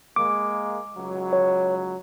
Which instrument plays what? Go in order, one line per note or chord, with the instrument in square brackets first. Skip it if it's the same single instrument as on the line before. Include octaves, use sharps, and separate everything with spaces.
[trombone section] G#3 A#3 [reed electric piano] D6
[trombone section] C#2 F#3
[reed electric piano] C#5